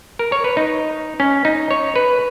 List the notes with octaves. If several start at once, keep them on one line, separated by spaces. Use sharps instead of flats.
A#4
C#5
B4
D#4
C#4
D#4
C#5
B4